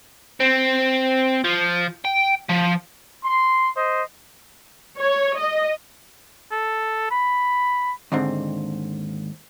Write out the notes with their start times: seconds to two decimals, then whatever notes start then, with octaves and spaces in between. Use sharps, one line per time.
0.40 C4
1.44 F3
2.05 G5
2.50 F3
3.24 C6
3.76 C5 D#5
5.00 C#5
5.38 D#5
6.52 A4
7.11 B5
8.12 D#2 G#2 D3 C4